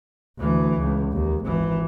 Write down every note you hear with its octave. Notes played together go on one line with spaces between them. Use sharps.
D2 E3
C#2
D#2
G#1 E3